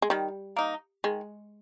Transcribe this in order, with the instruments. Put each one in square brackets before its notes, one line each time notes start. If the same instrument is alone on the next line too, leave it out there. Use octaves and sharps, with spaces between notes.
[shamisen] G#3
[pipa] D#3 [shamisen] G3
[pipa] A#3 D#4
[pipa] D#3 [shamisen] G#3